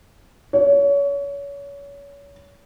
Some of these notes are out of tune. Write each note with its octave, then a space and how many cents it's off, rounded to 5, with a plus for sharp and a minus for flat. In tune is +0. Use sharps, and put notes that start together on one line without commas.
C#5 +30